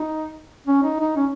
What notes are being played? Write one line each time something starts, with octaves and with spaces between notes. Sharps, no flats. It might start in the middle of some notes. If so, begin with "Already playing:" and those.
Already playing: D#4
C#4
D#4
D#4
C#4